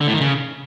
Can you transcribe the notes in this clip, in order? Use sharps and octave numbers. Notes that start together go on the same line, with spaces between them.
D3
A2
D#3
C#3